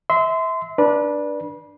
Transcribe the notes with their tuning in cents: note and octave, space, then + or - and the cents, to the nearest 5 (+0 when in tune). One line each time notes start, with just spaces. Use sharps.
E5 -25 C6 -25
D4 +0 B4 -30